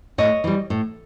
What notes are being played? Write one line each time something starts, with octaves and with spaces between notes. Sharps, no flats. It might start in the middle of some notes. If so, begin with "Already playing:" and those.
A2 C#5 D#5
E3 G3
A2